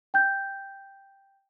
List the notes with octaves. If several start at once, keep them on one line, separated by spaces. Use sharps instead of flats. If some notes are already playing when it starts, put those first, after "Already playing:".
G5 G6